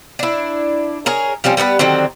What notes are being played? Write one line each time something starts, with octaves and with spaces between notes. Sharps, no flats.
D4 E4
G#4 A#4 C#5
F3 G3 C4 C#4
G3 B3 D#4 B4
D3 D#3 F#3 C4